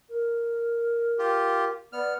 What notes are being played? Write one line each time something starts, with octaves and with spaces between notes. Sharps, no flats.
A#4
F4 G4
B3 D5 F6